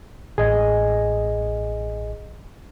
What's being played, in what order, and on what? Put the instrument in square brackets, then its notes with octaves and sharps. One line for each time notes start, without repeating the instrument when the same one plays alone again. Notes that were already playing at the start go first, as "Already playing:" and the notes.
[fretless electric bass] A1 [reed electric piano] G#4 D#5 G#5